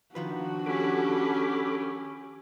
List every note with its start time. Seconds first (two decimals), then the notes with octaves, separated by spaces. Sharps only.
0.15 D#3 F3 D4 F#4 B4
0.66 C#4 G4 A4 B5 D6